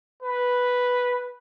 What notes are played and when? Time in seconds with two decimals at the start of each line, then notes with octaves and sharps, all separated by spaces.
0.23 B4